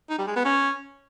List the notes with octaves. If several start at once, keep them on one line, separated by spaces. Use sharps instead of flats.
D#4
G3
G#3
B3
C#4